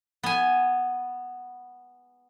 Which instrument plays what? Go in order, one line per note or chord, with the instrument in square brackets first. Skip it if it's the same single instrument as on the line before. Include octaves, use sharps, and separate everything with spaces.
[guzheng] B3 G#5